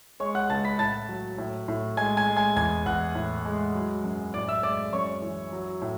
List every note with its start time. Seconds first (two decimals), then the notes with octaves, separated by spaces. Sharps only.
0.20 G#3 C#5 C#6
0.35 F#5 F#6
0.49 C#2 A5 A6
0.65 B5 B6
0.79 A2 A5 A6
1.09 F#3
1.38 A2
1.68 A2
1.97 G#3 G#5 G#6
2.17 G#5 G#6
2.27 G#3
2.37 G#5 G#6
2.56 E2 G#5 G#6
2.86 E2 F#5 F#6
3.15 A2
3.45 G#3
3.75 F#3
4.04 F#2
4.33 A2 D5 D6
4.48 E5 E6
4.63 G#3 D5 D6
4.93 F#2 C#5 C#6
5.22 E3
5.52 F#3
5.82 A2